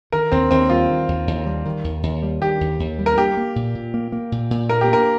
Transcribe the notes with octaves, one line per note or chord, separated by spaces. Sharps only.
D#3 A#4
D#2 C4
D#2 C4
G3 F4
D#3
D#2
D#2
G3
D#3
D#2
D#2
G3
D#3 G4
D#2
D#2
G3
A#4
A#3 G4
A#3
A#2
A#2
A#3
A#3
A#2
A#2
A#3 A#4
G4
A#3 A#4